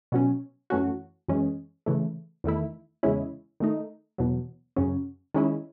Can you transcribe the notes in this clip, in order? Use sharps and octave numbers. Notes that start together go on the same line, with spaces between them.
B2 F#3 C#4
F#2 E3 A3 C#4 F#4
F#2 E3 G#3 C#4
C#3 E3 A3
E2 D#3 A3 E4
E2 C#3 G#3 C#4 E4
D#3 A3 D#4
E2 B2 F#3
F#2 C#3 F#3 C#4
D#3 G#3 C#4 E4